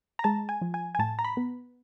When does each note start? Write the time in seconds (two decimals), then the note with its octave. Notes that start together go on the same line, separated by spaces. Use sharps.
0.19 A#5
0.24 G#3 A5
0.49 G#5
0.62 F3
0.74 G#5
0.95 G#5
0.99 A2 A5
1.19 A#5
1.25 B5
1.37 B3